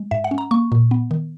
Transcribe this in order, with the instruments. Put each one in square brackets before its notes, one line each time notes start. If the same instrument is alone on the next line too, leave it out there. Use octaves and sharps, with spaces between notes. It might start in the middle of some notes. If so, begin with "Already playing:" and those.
Already playing: [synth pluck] G#3
G#2 E5
F#5
C#4
A#5
A#3 C#6
A#2
B3
D#3